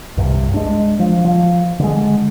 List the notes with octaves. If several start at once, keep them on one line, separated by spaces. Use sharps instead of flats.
C2 G2 C3
G#3 D4
F3
F3
D3 G#3